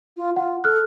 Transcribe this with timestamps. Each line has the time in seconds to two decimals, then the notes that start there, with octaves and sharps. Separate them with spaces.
0.17 F4
0.36 F4 F#5
0.64 A4 F6 F#6